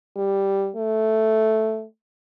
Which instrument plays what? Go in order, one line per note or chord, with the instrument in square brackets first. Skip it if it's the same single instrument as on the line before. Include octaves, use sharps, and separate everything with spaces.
[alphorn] G3
A3